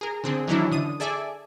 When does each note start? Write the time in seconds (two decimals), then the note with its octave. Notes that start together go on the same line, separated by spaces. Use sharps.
0.01 G#4 A#4
0.24 D3 C4 G#4
0.47 D#3 E3 F#3 C#4 D4 E4
0.72 D3 D#6 D#7
1.00 G#4 A4 D5 E5 G#5